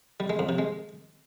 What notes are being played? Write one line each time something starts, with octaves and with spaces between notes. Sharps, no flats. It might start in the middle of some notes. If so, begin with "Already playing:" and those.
G3
G#3
F2
C3
G#3